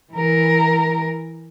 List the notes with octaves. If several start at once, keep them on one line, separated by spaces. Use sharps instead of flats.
E3 A#4